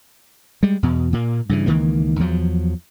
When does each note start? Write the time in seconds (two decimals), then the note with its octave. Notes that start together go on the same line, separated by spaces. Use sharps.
0.63 G3 G#3
0.83 E2 B2
1.13 A#2 A#3
1.49 G2 C#3 E3
1.66 C#2 D#3 E3 A#3
2.20 E2 F3 F#3